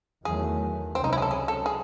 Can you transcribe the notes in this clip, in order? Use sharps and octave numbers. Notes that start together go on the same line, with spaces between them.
E2 D#3 F#3 A3 G#4
C#2 C3 F#3 C4 C#4
D#4
E4
G#4
A4
G#4
A4
G#4